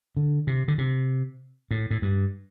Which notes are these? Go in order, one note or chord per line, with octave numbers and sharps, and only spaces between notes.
D3
C3
D3
C3
A2
A2
G2